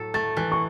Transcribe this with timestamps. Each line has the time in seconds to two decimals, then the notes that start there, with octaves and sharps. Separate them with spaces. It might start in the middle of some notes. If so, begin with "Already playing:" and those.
Already playing: A2 F#3 A4
0.14 A3 A6
0.37 E3 F#6
0.52 C#6